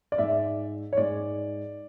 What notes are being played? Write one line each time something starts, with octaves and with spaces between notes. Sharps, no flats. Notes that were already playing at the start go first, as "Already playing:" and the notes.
D5
G#2 G#3 E5
C#5
G#2 G#3 D5